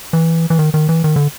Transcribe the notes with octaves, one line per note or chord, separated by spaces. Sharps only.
E3
E3
D#3
D#3
E3
D#3
D3